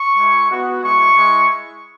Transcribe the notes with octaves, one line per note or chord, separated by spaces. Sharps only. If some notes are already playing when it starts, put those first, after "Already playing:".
Already playing: C#6
G#3 E4
B3 F#4
G#3 E4 C#6
G#3 E4